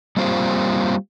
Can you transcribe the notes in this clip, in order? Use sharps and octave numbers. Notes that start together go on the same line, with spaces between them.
G3 A#3 C4 F4 G4 C5